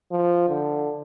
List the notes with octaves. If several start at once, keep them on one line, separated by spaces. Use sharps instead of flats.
F3
D3